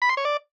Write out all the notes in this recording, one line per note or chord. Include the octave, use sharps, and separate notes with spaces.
B5
C6
C#5
D5